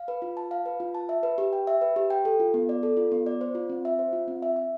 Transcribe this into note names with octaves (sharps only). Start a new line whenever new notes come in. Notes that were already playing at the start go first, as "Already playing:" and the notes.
Already playing: F5
B4
F4
A5
F5
B4
F4
A5
E5
B4
G4
G5
E5
B4
G4
G5
A4
F4
B3
D5
A4
F4
B3
D5
C5
F4
C4
E5
C5
F4
C4
E5
E5